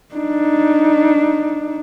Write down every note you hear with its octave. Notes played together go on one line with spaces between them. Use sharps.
D4 D#4